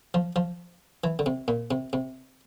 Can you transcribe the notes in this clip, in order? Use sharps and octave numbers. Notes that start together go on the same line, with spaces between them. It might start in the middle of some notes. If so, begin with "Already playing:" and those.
F3
F3
E3
D3
C3
A#2
C3
C3